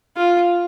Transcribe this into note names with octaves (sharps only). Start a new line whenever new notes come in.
F4